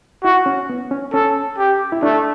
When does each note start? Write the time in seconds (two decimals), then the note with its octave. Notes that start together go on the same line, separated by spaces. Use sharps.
0.24 E4 F#4
0.46 C#4
0.70 B3
0.91 C#4
1.14 C#4 A4
1.58 G4
1.92 E4
2.03 A3 D4